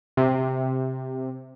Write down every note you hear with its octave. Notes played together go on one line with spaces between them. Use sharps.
C3